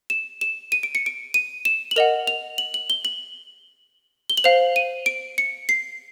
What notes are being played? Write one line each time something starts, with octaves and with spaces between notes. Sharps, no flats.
E7
E7
D#7
D7
C#7
D7
D#7
E7
F#7
A#4 D#5 F#5 F7
F7
F#7
F#7
G7
F#7
G7
F#7
C5 F5 F7
D#7
D7
C#7
C7